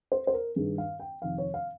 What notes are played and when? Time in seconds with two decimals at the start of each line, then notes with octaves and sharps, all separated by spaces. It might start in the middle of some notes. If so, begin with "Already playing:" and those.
0.12 C5
0.27 C5
0.34 A#4
0.56 G2 D#3 G#4
0.78 F5
1.00 G5
1.22 F2 C3 D#3 F5
1.38 C#5
1.54 F5